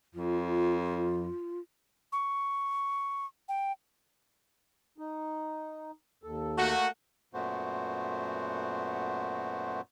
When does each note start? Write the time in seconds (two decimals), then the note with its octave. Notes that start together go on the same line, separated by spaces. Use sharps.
0.15 F2 F4
2.12 C#6
3.49 G5
4.98 D#4
6.23 D#2 A4
6.58 A3 A#3 F#4
7.34 F#2 A#2 A3 B3 F#4 C5